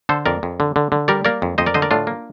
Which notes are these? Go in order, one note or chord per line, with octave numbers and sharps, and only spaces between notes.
D3 A4 C5
F2 A#4 D5
F2
D3
D3
D3
G3 A#4 D5
A#3 A#4 D5
F2
F2 C5 D#5
A#4 D5
D3 C5 D#5
A#4 D5
A2 D4 F4
A#3